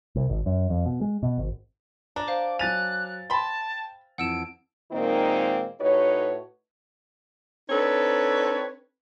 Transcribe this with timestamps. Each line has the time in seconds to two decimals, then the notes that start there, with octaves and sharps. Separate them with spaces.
0.16 C2
0.30 G#1
0.46 F#2
0.70 F2
0.86 B2
1.01 G#3
1.23 B2
1.38 G#1
2.16 D4 A#5
2.28 C5 F5 D6
2.59 F#3 G#5 F#6 A6 F7
3.30 G5 A5 B5 C6
4.18 F2 E3 F#5 E6 D7 E7
4.92 A#2 D#3 G#3 A#3 C4 D#4
5.81 A2 D#4 F#4 B4 C#5
7.70 C4 D4 D#4 A4 B4 C#5